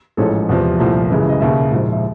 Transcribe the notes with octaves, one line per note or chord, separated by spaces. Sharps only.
A1 G#2 F3 G#3 C#4 A4
E2 C3 F3
C2 A#2 F3 A3
F#2 C#3 E3 G#3
D#5
E1 D#2 C#3 E5
A#1 G#2 F3 G#3
E5